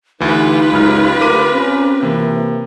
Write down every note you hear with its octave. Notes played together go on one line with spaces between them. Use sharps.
D2 E3 D#4 F4 G4 B4
C#2 F#2 G#3 F6
D2 A#4 D6 D#7
C4 C#4
C3 E3 A#3